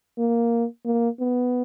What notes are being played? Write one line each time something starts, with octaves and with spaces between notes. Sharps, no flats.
A#3
A#3
B3